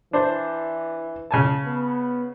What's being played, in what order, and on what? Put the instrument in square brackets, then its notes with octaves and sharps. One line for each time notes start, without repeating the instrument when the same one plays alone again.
[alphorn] E3 [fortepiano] D4 C5
[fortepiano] C#3 G#5 A5
[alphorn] B3